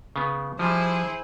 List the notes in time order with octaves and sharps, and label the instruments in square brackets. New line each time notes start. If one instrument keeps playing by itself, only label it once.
[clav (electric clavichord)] C#3 B3
[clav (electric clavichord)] F3 G3 [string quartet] E4 G#4 C5